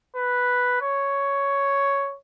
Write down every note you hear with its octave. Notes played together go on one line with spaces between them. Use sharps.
B4
C#5